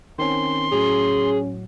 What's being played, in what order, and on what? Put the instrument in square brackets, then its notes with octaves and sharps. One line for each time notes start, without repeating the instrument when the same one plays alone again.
[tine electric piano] D#3 C4 C#4 [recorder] C6
[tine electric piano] A2 F#3 [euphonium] C#4 [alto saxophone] G#4